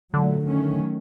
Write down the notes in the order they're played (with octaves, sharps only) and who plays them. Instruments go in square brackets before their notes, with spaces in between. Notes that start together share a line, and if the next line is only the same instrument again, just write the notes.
[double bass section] A#2 F#3 A3 [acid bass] D3
[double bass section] D#3 F#3 A3 C#4